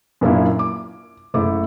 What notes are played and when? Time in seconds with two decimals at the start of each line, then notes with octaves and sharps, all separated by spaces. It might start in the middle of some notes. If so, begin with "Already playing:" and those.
0.21 F#2 A#2 A#3 D4 E4 F4
0.59 D6
1.34 F#1 A3 E4 D6